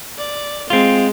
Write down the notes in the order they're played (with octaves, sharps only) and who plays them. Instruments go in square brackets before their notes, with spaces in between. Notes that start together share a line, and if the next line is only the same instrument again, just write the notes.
[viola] D5
[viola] G#3 [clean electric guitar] C4 F4